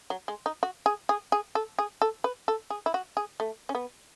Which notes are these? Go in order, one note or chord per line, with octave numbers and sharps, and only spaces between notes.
F#3
G#3
D#4
F#4
G#4
G#4
G#4
A4
G#4
A4
B4
A4
G#4
E4
F#4
G#4
A3
C#4
B3